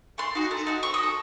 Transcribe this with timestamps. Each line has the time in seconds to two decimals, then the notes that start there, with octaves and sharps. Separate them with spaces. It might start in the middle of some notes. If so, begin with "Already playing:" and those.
0.18 A3 C6
0.35 D#4 F#4
0.51 A3
0.67 D#4 F#4
0.83 C4 C#6
0.94 D#6
0.98 F#4
1.03 A4